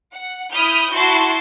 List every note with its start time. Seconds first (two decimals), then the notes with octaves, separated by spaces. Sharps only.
0.13 F#5
0.52 E4 B5 D#6 F6 G6
0.93 E4 F#4 A5 C6